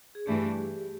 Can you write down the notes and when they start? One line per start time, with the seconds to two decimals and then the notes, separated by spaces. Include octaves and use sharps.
0.15 G#4
0.27 G2 E3 A3 D4 G4